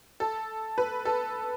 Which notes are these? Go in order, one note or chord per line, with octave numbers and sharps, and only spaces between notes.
A4
B4
A4